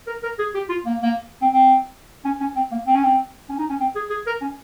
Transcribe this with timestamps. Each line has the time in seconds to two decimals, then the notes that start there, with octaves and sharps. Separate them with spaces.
0.07 A#4
0.23 A#4
0.39 G#4
0.54 G4
0.69 F4
0.85 A#3
1.02 A#3
1.41 C4
1.53 C4
2.25 C#4
2.40 C#4
2.56 C4
2.71 A#3
2.87 C4
2.95 C#4
3.03 C4
3.49 C#4
3.58 D#4
3.70 C#4
3.80 C4
3.95 G#4
4.10 G#4
4.26 A#4
4.41 C#4